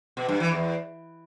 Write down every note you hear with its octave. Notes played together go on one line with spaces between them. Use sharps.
B2
G2
E3
E2